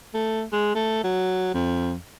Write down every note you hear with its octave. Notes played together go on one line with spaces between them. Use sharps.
A3
G#3
A3
F#3
F2